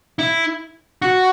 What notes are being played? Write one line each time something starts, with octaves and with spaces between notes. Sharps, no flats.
E4
F#4